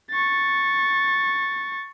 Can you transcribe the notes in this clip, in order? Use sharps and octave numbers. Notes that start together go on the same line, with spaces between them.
C#6 A6